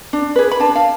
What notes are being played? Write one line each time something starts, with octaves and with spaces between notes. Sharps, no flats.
D4
G#4 B4
B5
D4 A5
F5